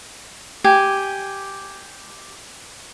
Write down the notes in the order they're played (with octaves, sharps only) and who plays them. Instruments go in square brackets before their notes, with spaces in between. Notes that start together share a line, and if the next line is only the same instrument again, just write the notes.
[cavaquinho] G4 G#5